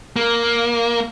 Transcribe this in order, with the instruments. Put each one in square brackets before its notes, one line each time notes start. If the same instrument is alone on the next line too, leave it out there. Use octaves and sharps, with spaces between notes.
[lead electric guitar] A#3